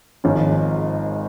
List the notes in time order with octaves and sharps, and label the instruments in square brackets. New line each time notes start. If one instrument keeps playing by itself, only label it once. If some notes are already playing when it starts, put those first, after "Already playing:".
[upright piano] G#1 G#2 F3 C#4